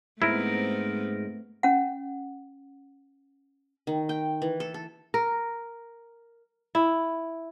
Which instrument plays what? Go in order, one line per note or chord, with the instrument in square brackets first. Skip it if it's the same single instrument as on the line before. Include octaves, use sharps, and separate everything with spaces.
[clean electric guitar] G#2 A#4 [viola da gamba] A3 B3 C4 [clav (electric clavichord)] E4
[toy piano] C#4 F#5
[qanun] D#3
G5
E3
A4
A4
[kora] A#4
E4